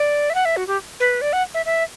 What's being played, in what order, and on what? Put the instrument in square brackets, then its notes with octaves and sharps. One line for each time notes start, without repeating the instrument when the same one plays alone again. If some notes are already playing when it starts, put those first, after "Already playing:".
Already playing: [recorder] D5
E5
F#5
E5
F#4
G4
B4
D5
F#5
E5
E5